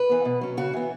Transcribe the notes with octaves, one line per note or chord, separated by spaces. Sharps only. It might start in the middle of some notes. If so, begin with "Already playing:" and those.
Already playing: B4
E3 B3
B2
F#3 C#4
C#3 F#4
E3 B3